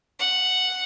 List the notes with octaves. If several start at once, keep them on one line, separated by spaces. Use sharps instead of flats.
F#5